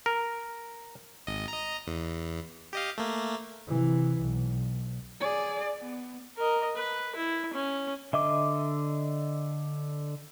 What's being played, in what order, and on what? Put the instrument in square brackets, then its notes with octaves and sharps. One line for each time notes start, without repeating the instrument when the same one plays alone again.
[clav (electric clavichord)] A#4
[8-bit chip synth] G#1 D#5
D#5 A#5
E2
G4 D#5 F5
A3 A#3
[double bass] C3 E3
B1
[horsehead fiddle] G#4 D5
B3
[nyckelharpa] A#4 D#5
B4
E4
C#4
[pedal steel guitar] D3 D#5 E5 D6